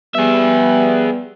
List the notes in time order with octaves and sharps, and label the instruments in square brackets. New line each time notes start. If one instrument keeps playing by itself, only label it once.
[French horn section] G3 B3 [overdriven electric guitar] G#4 E5